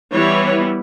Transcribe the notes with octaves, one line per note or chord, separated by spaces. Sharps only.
E3 G3 B3 E4 C#5